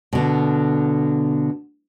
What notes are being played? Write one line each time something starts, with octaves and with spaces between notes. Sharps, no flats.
B2 D3